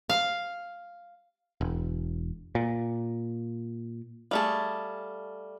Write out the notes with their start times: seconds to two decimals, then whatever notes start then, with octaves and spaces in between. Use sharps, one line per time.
0.09 F5
1.61 E1
2.55 A#2
4.31 G3 A3 G#4 F5 A5